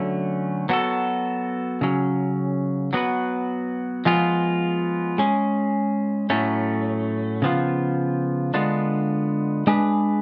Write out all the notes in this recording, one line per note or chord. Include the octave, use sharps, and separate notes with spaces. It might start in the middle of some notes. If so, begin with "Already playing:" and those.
Already playing: D3 F#3 A3 C#4
F#3 B3 F#4 A4
C#3 F#3 C#4
F#3 B3 F#4 B4
F3 G#3 B3 F4 G#4
G#3 C#4 G#4
A2 F#3 A3 C#4
C#3 F3 B3 F4
D3 G#3 B3 D4 F4
G#3 D4 G#4 B4